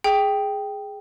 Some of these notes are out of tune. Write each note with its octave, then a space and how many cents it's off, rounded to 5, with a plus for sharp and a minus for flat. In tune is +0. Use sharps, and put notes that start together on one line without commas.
G#4 +0 G5 +0